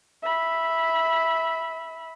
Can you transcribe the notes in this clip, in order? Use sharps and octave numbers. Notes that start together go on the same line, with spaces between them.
E5 B5